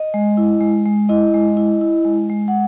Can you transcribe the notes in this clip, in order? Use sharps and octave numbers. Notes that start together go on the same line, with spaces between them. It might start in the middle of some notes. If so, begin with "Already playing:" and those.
Already playing: D#5
G#3
E4
G#3
G#3
E4 D#5
G#3
E4
E4
G#3
G#3
F#5